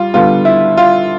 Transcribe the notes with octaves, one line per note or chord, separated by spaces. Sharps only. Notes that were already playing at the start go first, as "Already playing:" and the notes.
Already playing: G3 F4
D3 G3 B3 F4
E4
F4